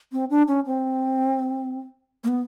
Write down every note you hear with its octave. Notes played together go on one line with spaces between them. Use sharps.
C4
D4
C#4
C4
A#3
B3